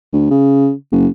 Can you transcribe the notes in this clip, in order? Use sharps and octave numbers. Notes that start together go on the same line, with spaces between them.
D2
C#3
F#1